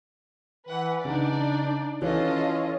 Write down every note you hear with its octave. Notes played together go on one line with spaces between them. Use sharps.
E3 B4 F#5
C#3 D4 D#4 D5
E3 C#4 F4 A4 C#5 D#5